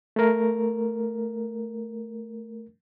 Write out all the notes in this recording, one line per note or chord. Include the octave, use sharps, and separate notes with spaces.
A3 A#4